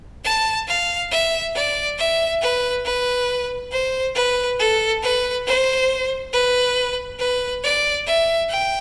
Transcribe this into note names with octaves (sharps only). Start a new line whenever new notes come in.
A5
F5
E5
D5
E5
B4
B4
C5
B4
A4
B4
C5
B4
B4
D5
E5
G5